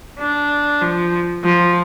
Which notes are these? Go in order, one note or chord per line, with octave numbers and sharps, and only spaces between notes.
D4
F3
F3